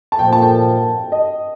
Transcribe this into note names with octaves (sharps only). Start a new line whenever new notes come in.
A5
A#2 F3 A#3 G5
A5
G5
D#5